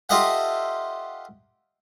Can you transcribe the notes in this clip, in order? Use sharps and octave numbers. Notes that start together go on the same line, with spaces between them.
F4 G4 A4 D#5 E5 F#5